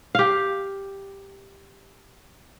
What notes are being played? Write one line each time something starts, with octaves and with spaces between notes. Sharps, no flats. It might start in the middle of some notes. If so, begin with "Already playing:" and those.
G4 F5